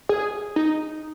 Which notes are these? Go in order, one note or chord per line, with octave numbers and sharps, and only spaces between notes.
G#4
D#4